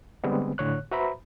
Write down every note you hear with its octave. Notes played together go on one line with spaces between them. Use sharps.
D3 G3 G#3 B3 C4
A2 D3 C#5 F#6
F#4 B4 C5 E5 A#5 B5